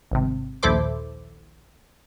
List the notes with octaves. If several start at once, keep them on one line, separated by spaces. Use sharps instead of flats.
G#1 C3
A#1 D#2 E4 A4 C5 D6